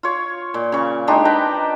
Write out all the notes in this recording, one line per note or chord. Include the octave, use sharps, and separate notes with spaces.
F4 C#5
A#2
C#3 C#6
G#3 D4 D#4 G4
B4 G5 A5 A#5